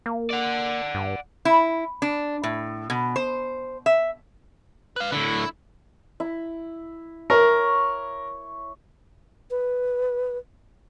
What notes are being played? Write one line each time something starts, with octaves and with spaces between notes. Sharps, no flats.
A#3
D5 F#5
G2
E4
D4
A2
B2
C5
E5
B4 F5
A2 D3 E4
E4
A#4 C#5 E5
B4